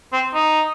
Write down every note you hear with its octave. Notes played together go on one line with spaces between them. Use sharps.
C4
D#4